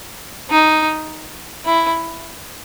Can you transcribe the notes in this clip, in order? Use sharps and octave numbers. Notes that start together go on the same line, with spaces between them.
D#4
E4